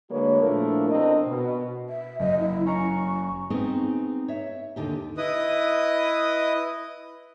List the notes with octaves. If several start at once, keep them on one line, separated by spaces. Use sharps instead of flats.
D3 G#3 A#3 F#4 B4 C#5
A#2 F3 A3 D4 E4 A#4
B2 C4 D4 A#4 D#5
B2
E5
F#1 D#5
E4
C#4 A#5 C#6 C#7
B3 C4 D#4 G#4
C#5 E5
D#2 D3 D#4 G4
E4 B4 D#5 D#6